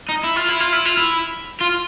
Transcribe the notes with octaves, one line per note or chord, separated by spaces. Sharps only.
D#4
E4
F4
E4
F4
E4
F4
E4
F4